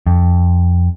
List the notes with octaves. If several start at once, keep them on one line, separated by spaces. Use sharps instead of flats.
F2